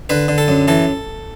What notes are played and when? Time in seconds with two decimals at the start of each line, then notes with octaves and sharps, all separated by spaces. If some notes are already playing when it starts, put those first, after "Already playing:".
0.09 D3 B4
0.28 D3
0.38 A4
0.48 F#2
0.68 E3 A4